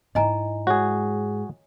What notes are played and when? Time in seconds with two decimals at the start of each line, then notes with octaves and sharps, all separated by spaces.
0.15 G#2 E4 D#5 G#5 A#5
0.67 G#3 F#4 G#4 C#5